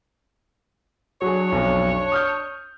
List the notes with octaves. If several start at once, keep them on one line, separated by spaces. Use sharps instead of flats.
F#3 D4 G#4 C#5
B1 F2
D#6 F6 G6